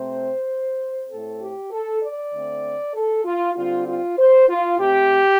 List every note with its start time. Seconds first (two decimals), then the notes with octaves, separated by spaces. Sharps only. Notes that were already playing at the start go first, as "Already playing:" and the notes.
Already playing: C3 A3 C4 C5
1.10 A2 A3 C4 A4
1.41 G4
1.71 A4
2.02 D5
2.33 D3 A3 C4
2.94 A4
3.24 F4
3.55 D3 G3 C4 F4
3.86 F4
4.17 C5
4.48 F4
4.78 C3 A3 C4 G4